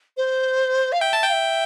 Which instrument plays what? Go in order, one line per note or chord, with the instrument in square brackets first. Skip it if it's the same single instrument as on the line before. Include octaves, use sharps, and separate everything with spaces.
[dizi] C5
F5
[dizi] E5 [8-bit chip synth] G5
[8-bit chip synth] A5
[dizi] F5 [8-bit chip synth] G5
[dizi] E5